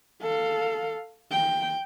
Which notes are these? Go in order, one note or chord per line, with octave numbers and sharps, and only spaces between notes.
A4 F5
G5